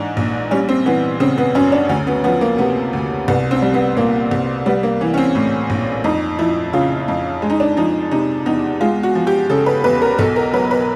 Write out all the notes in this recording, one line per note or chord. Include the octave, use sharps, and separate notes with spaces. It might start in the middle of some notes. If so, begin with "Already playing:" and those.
Already playing: G#2 E3 D4 D#4
A#1
G3 C#4
C4
E3 B3
C#3 C4
B3
F#2 C#4
D4
D2 C#4
B3
F3 B3
A#3
C3 B3
D2
C2 B3
C4
G3
B3
A#2 A#3
C2
G3 B3
A#3
E3
C#4
C4
A2
A#1
F2 D#4
F3 E4
C#3 F4
F2
G#3
D#4
D4
F3 D#4
C3 D#4
E2 D#4
G#3 F4
F#4
F3
G4
C#3 A4
B4
E2 B4
A#4
B1 A4
A#4
F#3 B4
B4